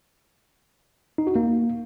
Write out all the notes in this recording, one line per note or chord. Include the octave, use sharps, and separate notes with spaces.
D#4
F#4
A#3